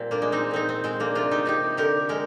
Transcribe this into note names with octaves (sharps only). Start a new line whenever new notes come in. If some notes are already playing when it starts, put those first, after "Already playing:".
Already playing: A#2 G3 C4
A#3 D4
G#3
C4 D#4
A#2 C4 D#4
C4
G#3 C4
A#3 D4
C3 D4 F4
D#4 G4
C3 D#4 G4
D3 G4 A#4
G#3 G4 A#4